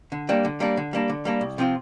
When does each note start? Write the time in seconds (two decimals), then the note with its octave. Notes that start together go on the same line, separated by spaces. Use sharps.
0.12 D3
0.29 G3 A#3 D4
0.45 D3
0.60 G3 A#3 D4
0.77 D3
0.93 G3 A#3 D4
1.09 D3
1.25 G3 A#3 D4
1.41 C2
1.58 C3 F3 C4 F4